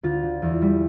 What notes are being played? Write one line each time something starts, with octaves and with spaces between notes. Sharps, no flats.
D2 F4
D3
E2
G3